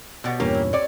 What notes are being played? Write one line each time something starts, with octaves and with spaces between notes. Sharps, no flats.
B2 B3 F#4 G4 D5
E2 G2 A#2 A#3 B3 C#4 G4 A#4
E4
C4 C#5 D5